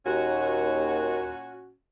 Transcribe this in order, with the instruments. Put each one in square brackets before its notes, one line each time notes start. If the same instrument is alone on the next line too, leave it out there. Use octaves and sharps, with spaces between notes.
[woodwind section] D#2 [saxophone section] A#2 C#4 F#4